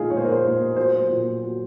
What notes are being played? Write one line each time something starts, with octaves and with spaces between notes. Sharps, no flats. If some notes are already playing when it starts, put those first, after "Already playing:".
Already playing: A#2 G#3 D#4 F4 G#4
A#2 C#5
C5
A#4
C5
A#2
F#3 C5
A#2
F#3